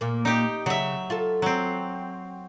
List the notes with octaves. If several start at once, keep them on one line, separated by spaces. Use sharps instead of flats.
A#2 A#3
D#4 G4
C#3 F#3 E5
F4 A4
F#3 C4